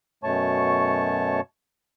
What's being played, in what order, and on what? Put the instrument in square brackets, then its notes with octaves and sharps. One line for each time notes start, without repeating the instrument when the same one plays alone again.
[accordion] F#2 B2 A3 C#5 A5 C#6